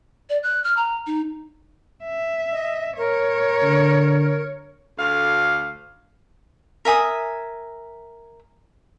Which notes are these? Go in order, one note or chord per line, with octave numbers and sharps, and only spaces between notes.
D5
F#6
F6
A#5
D#4
E5
D#5
A#4 C#5
D3
D2 F5
A#4 E5 G#5 D#6